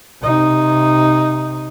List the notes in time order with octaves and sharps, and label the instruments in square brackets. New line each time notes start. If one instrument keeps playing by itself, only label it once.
[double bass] C3 D#4